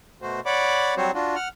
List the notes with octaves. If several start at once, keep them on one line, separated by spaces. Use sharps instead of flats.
B2 A3 F#4 C5
C#5 D5 F#5 B5 D6
F#3 G3 C4 F#4 C5 C#5
D4 F4 F#4
F#5 F6